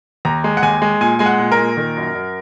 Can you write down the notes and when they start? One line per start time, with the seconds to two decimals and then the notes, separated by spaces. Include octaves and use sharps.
0.25 D#2 A#5
0.44 G#3
0.57 F#5
0.63 D#2 G#5
0.82 G#3
1.01 A#2 G#5
1.19 G#3 G#5
1.26 F#5
1.39 A#2
1.52 A#4
1.59 A#2
1.77 D#3
1.97 F#2
2.15 F#2